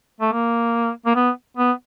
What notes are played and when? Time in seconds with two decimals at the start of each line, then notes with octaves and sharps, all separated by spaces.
0.21 A3
0.32 A#3
1.06 A#3
1.15 B3
1.57 B3